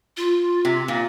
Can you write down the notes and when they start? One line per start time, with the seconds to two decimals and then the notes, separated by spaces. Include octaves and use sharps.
0.17 F4
0.65 C3
0.88 A#2